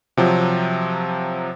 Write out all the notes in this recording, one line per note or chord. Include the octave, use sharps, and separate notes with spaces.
C3 F3 F#3